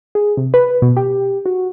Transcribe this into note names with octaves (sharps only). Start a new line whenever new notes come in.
G#4
C3
B4
B2
G4
F#4